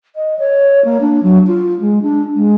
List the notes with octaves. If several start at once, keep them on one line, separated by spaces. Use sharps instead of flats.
D#5
C#5
A#3
D4
F#3
F4
G#3
D4
G#3